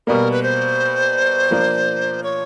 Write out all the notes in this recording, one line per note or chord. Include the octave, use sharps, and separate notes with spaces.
B2 G3 A#3 A#4
B4
C5
F3 A#3 D4
C#5